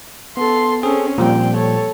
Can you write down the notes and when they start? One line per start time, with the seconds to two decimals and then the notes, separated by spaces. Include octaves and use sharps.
0.37 B3 A4 C6
0.83 C4 C#4 G#4 A4
1.18 A#2 F3 G3 C4 G5
1.55 A4 C#5